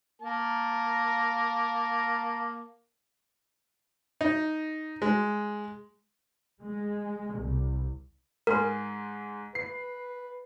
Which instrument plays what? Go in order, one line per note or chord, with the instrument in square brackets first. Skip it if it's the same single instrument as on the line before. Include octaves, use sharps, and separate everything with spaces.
[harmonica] A#3 A#4 A5
[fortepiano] D#4
G#3
[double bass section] G#3
C2
[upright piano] G#2 G#4 C6 [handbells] A#4
[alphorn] B4 [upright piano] C7